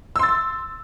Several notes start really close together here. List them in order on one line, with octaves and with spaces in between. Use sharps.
E6 C6 A6